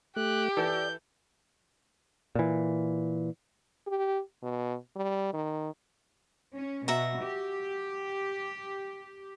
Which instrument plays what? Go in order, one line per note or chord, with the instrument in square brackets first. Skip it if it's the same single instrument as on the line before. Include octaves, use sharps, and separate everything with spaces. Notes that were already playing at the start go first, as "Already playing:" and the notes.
[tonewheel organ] A3 [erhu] G4 [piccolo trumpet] F#6
[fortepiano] E3 A4 [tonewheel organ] D5 [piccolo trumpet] G6
[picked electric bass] A#2 E3
[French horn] G4
B2
G3
D#3
[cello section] C#4
[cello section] B2 [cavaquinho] F#4 E5 A#5
[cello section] G4